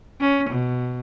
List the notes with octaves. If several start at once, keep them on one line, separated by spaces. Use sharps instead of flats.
C#4
B2